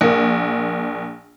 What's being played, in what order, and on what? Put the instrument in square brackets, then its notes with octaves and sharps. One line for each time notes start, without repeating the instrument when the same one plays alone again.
[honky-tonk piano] A#1 A#3